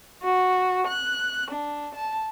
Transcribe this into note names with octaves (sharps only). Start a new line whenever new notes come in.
F#4
F#6
D4
A5